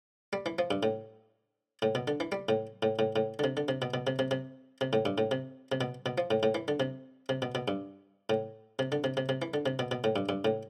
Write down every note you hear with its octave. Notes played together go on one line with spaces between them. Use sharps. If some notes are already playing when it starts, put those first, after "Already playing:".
G3
E3
F3
G2
A2
A2
B2
D3
E3
G3
A2
A2
A2
A2
D3
C3
D3
C3
B2
B2
C3
C3
C3
C3
A2
G2
A2
C3
C3
B2
B2
F3
A2
A2
E3
D3
C3
C3
B2
B2
G2
A2
C3
D3
C3
C3
C3
E3
D3
C3
B2
B2
A2
G2
G2
A2